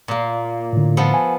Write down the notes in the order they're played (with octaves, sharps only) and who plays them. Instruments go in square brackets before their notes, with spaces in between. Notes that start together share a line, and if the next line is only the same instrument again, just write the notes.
[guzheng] A#2 A#3
[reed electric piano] A2 D3
[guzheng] F3 B3 A4
[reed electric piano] G#5